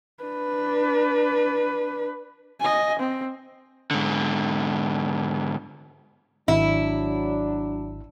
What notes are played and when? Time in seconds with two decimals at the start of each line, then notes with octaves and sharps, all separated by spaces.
0.23 D4 B4
2.60 D#5 G#5
2.99 C4
3.91 G#2 D3
6.48 G#1 F#3 D4 E4